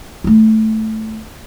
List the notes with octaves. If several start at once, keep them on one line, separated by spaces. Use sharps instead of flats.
A3 E4